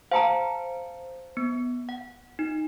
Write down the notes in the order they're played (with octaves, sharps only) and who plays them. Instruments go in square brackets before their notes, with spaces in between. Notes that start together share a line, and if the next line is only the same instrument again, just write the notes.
[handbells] C5 C#7 D7 [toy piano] F5 A5 A#5
[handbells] B3
F#5
D#4